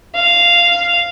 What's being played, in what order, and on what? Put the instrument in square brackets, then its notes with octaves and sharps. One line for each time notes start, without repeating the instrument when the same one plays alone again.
[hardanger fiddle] F5